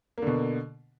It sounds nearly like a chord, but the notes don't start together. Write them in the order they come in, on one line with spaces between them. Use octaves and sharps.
A#3 D3 B2